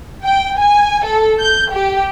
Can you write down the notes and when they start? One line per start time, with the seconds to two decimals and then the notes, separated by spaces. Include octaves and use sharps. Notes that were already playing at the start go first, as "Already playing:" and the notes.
0.23 G5
0.56 G#5
1.05 A4
1.39 G6
1.72 G4